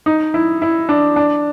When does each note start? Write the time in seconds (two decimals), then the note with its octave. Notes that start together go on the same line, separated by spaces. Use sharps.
0.06 D#4
0.34 E4
0.62 E4
0.89 D4
1.16 D4